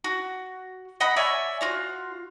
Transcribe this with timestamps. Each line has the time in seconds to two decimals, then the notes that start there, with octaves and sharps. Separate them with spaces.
0.04 F#4
1.00 D#5 F#5 A#5 B5
1.16 C#5 D5 E5 G#5
1.61 F4 F#4 F5